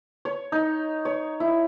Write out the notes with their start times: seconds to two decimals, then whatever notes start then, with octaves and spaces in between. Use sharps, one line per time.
0.25 C#5
0.52 D#4
1.05 C#5
1.40 E4